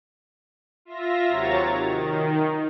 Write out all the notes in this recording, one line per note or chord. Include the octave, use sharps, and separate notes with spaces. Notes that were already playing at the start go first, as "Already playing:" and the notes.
F4 E5 A#6
D#2 C3 F#3 C#5 A#5 A6
D#3